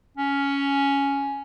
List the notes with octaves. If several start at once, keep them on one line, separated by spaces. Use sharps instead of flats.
C#4